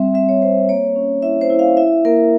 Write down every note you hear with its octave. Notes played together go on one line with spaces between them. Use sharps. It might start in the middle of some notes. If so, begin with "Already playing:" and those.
Already playing: G3 C4 E5
G3 E5
C#5
C4 C5
A#3 C#5
C#4
E4 E5
C5
E4
F5
E4 E5
A#3 A#4